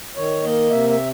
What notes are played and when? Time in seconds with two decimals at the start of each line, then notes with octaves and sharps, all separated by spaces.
0.16 D#3 C#5
0.43 A#3 D#5
0.70 C3 E5
0.90 E5